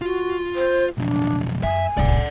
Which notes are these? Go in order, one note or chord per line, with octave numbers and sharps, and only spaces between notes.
F4 F#4
C5
B1 F2 D4
F#2 E5 G#5
D1 C2 D5 F#5